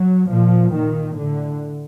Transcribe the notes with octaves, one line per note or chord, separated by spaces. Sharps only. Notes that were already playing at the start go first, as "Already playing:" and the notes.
Already playing: F#3
A#2 F3
A#2 D#3
A2 D3